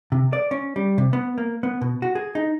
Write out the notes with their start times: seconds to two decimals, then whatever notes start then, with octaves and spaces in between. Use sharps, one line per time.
0.12 C3
0.33 D5
0.51 C#4
0.76 G3
0.98 C3
1.13 B3
1.38 A#3
1.63 B3
1.81 B2
2.02 F#4
2.15 G#4
2.35 D#4